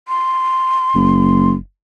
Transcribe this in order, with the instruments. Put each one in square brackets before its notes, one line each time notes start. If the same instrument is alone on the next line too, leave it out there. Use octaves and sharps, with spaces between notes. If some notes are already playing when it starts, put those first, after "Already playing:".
[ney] C6
[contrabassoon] F#1